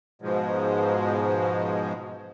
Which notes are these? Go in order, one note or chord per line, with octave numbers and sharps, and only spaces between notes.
G#2 B2 F3 G#3